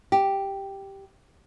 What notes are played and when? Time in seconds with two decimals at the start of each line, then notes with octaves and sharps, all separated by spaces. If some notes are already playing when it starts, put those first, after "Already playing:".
0.12 G4